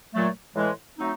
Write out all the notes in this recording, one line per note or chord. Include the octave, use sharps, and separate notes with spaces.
A#2 F#3 A3
A2 E3 G#3
F#3 A3 C4 D#4